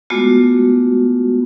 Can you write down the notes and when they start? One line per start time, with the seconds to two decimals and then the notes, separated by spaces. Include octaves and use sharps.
0.10 G#3 A3 B3 F4 F#4